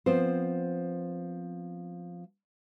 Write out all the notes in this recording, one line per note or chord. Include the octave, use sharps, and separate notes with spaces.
F3 B3 C4 C5